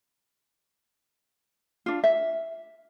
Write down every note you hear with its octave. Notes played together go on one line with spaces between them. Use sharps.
D4 F4
E5